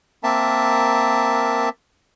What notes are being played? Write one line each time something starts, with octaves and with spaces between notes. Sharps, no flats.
A#3 C4 A#4 E5 A5